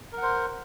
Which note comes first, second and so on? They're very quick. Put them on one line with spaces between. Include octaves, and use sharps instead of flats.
A#4 F#5 C5